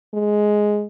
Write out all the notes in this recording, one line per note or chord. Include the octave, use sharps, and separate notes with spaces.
G#3